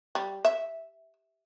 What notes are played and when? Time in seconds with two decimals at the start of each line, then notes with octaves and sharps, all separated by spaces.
0.15 G3
0.45 E5